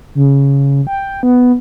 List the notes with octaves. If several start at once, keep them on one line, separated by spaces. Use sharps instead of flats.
C#3
G5
B3